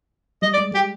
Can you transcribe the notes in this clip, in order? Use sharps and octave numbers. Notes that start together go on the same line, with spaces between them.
G3 D#5
D5
G#3
G#3 G4